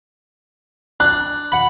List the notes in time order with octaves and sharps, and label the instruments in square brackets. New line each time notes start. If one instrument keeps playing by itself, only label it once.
[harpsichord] D4 [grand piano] F#6
[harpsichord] F#5 B5